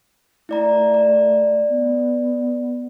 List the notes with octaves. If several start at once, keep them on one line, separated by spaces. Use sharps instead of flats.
A3 E4 D5 A#5
D5
B3